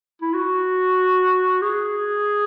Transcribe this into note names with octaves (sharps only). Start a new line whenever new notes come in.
E4
F#4
G#4